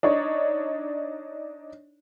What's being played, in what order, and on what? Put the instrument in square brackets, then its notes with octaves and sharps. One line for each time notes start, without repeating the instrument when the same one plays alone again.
[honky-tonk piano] D4 D#4 C#5